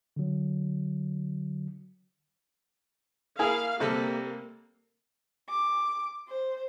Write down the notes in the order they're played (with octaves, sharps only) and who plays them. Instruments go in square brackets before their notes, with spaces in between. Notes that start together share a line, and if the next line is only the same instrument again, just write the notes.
[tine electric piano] D3 F#3
[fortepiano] A#3 E4 G#4 [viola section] F5
[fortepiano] C3 G3 A4 [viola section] A#3
[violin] D6
C5